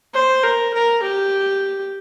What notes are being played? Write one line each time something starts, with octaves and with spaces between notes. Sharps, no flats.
C5
A#4
A#4
G4